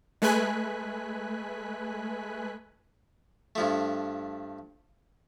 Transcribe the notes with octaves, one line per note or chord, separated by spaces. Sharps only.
G#3 A3 B4 G#5 F#6 B6
G2 F3 A3